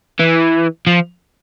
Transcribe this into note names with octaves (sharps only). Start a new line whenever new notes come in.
E3
F3